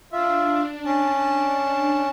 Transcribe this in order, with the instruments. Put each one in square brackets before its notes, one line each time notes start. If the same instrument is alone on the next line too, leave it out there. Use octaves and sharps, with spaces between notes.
[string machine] D4 [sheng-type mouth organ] F4 E5
[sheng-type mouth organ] C#4 A5